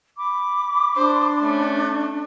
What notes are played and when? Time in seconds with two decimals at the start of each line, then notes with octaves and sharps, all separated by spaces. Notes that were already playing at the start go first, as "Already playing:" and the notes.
0.19 B5 D6
0.96 D4 C5
1.41 A3 C#4